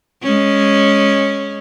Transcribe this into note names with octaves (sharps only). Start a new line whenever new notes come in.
G#3 C#4